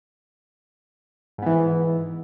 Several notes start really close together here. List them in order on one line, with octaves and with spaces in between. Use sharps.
G#2 B3 E3